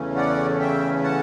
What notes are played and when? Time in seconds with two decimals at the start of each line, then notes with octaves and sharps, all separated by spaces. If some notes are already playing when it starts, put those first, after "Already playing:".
Already playing: E2 C#3 E3 A3 C#4
0.16 D5 F#5
0.60 E5 G5
1.03 F#5 A5